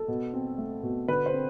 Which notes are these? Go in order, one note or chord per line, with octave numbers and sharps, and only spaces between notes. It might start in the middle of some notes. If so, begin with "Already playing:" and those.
Already playing: A4
B2
C4
A3
B2
D3 B4
C5
C4